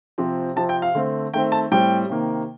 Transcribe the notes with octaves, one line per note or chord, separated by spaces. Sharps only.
C3 F3 C4
C3 F3 C4 A5
G5
F5
D3 A3 C4
D#3 A3 C4 G5
A5
A2 G3 C4 G5
C3 D#3 A#3